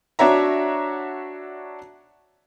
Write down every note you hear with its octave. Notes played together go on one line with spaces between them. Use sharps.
D4 F#4 C#5 E5 A#5